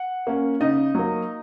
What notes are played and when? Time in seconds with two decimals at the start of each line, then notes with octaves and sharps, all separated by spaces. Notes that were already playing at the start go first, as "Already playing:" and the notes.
Already playing: F#5
0.27 A#3 C#4
0.60 C#3 D#4 D#5
0.95 F#3 A#3